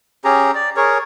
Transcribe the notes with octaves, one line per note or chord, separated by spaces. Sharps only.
C#4 G4 G#4 A#5
D5
G#4 A#4 C#5